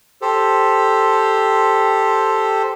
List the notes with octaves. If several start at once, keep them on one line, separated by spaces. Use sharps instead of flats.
G4 A4 C5